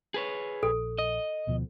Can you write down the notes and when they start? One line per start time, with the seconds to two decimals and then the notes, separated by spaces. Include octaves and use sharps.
0.14 G#4 B4 C#5
0.63 A#1 A4
0.99 D#5
1.47 D2 B2 F3